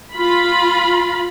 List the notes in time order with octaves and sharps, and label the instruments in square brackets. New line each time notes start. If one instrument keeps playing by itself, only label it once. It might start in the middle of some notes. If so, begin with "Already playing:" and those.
[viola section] F4 B5